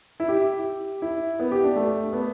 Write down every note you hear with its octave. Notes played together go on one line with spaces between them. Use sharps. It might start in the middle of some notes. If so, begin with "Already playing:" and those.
E4
G4
E4
B3
G4
D4
A3
B3